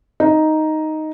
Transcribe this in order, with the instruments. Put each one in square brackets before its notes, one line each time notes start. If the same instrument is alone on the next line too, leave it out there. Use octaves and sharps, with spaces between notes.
[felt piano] D#4